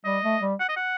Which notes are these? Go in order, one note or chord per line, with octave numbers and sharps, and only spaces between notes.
G3 D#5
A3
G3
F#5
D#5
F#5